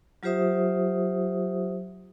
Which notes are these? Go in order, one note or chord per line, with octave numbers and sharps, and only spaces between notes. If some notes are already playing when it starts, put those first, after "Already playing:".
F#3 F4 G4 C5 E5 D#6